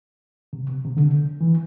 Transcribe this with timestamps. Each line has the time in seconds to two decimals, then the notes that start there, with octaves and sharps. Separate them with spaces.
0.53 C3
0.85 C3
0.97 D3
1.41 E3